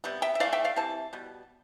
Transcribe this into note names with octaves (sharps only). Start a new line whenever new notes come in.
C3 G3 B3
E5 G5
E5
E3 A3 D5 F5
E5 G5
D5 F5
C3 E3 A5
B2 G3 B3